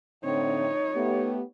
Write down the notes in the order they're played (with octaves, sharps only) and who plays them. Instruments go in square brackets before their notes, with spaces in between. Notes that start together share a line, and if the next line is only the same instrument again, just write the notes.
[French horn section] A2 D3 C4 [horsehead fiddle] D#4 C#5
[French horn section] A3 B3 G4